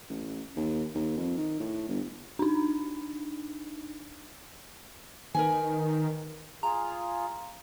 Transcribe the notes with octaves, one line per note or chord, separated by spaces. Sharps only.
A1
D#2
D#2
F2
D#3
A2
G1
D4 D#4
D#3 A#4 B4 G#5
F4 G#4 A#5